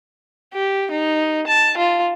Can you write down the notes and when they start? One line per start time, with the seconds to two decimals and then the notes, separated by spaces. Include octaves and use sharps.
0.54 G4
0.91 D#4
1.47 A5
1.78 F4